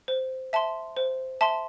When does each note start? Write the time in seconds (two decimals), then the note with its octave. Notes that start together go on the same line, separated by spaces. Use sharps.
0.08 C5
0.53 E5 A5 C6
0.97 C5
1.41 E5 A5 C6